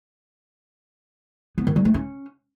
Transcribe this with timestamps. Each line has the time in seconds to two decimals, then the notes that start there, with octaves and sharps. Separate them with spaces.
1.58 B3
1.67 D#3
1.76 G3
1.85 A3
1.94 C#4